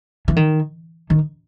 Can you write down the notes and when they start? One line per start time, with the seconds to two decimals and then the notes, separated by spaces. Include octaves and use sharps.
0.28 E3
0.36 D#3
1.10 D#3